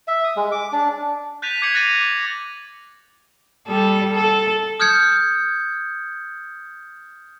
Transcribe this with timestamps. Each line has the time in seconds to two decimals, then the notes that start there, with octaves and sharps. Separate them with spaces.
0.08 E5
0.24 D#6
0.36 G#3
0.52 D6
0.72 D4
1.42 F#6 G6 A6 B6 D#7 F7
1.62 D6 G#6 C7 C#7 F#7
1.75 F#6 A6 A#6 D#7 F7 F#7
2.01 D6
3.67 G3 A4
4.14 A4
4.80 D#6 F6 G6 G#6 C#7